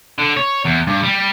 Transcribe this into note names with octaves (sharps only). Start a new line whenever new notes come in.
D3
C#5
E2
G2
G3